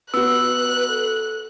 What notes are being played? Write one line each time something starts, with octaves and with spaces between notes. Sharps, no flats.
B3 F#4 B4 E6 F#6
A4